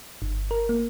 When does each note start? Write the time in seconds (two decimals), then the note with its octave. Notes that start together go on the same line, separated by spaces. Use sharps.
0.22 G1
0.51 A#4
0.69 A#3